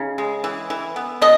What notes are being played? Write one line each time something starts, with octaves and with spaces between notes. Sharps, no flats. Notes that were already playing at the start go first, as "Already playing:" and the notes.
Already playing: C#3 D#4
G#3
E3
E3
B3
B2 D#5